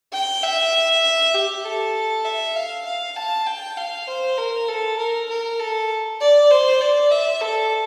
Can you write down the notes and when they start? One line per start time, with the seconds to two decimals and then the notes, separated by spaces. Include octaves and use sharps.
0.13 G5
0.43 E5
1.34 G4
1.65 A4
2.25 E5
2.56 F5
2.86 F5
3.16 A5
3.47 G5
3.77 F5
4.07 C5
4.38 A#4
4.68 A4
4.99 A#4
5.29 A#4
5.59 A4
6.21 D5
6.51 C5
6.81 D5
7.11 E5
7.41 A4